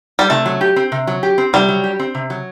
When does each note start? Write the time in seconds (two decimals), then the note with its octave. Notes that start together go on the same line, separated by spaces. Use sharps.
0.19 G3
0.30 C3 A3
0.46 F#3
0.61 G4
0.76 C4
0.92 C3
1.07 F#3
1.23 G4
1.38 C4
1.53 C3 G3
1.69 F#3
1.84 G4
2.00 C4
2.15 C3
2.30 F#3